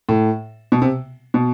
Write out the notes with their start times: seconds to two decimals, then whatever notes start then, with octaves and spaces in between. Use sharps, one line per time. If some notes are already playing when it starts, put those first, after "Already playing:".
0.09 A2
0.72 B2
0.82 C3
1.34 B2